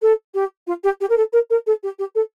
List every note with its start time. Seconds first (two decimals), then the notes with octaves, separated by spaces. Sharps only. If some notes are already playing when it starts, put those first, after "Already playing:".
0.02 A4
0.34 G4
0.67 F4
0.84 G4
1.01 G4
1.10 A#4
1.17 A4
1.33 A#4
1.50 A#4
1.66 A4
1.83 G4
1.99 G4
2.15 A4